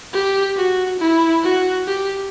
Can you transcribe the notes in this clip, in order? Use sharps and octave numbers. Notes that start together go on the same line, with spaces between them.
G4
F#4
E4
F#4
G4